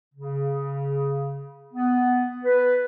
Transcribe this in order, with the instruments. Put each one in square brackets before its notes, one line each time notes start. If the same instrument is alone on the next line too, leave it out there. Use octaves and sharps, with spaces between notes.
[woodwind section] C#3
B3
B4